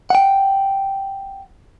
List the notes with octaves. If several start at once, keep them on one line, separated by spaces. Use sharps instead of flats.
F#5 G5